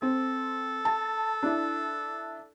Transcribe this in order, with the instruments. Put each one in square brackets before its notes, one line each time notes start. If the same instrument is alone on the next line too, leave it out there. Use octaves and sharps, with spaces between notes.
[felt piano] C4 [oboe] A4
[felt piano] A5
D4 E4